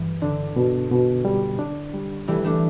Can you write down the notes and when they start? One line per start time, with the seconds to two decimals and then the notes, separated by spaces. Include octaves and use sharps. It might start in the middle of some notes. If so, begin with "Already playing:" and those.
Already playing: G2 E3
0.21 D3 D4
0.56 B2
0.91 B2
1.25 G3
1.59 D4
1.94 G3
2.28 E3 G3 A3
2.44 A3 D4